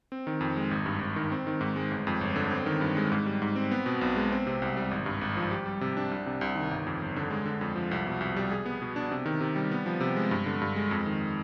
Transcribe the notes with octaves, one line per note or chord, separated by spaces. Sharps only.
C4
D#3
F2
G#3
G#1
G2
G#1
D#3
C4
D#3
G#2
G#3
G1
F2
G1
D3
C4
D#3
G2
G#3
G#2
G3
G#2
C4
B3
B2
B1
G#3
C4
C3
C2
G3
G#1
G2
G#1
F3
G4
G3
C3
D4
C2
C3
C2
D#3
G1
F2
G1
D3
G#3
D3
F2
F3
C2
B2
C2
G3
G#4
B3
B2
D4
C3
D#3
C3
G3
B3
F3
C3
G#3
G2
D3
G2
G#3
F2
D#3